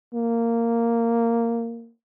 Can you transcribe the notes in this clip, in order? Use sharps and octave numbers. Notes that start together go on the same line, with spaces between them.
A#3